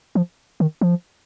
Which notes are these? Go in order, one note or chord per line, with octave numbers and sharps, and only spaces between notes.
F3
D#3
F3